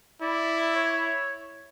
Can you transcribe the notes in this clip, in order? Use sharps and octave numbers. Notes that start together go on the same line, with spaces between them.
E4 D5
C#5